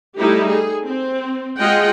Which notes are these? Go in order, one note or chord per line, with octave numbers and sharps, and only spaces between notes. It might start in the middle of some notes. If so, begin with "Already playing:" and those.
G3 A3 D#4 E4 G4
G#4 A4
C4
G#3 F4 G#4 D#5 F#5 G5